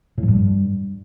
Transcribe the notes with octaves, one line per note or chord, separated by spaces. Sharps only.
A2
F3
G2